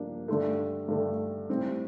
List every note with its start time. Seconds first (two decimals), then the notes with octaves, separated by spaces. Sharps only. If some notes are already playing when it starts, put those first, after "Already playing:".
Already playing: G2 F3 A#3 D4
0.28 G2 D3 A3
0.88 G2 D3 A3
1.50 A2 G3 C4